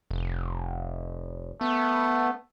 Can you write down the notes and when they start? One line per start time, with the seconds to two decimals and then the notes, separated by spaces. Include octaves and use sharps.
0.11 F1
1.61 A3 B3